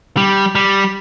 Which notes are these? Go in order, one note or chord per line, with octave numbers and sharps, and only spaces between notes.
G3
G3